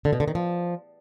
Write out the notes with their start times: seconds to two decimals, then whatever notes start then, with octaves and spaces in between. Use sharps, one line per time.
0.05 D3
0.13 B2
0.20 D3
0.28 D#3
0.35 F3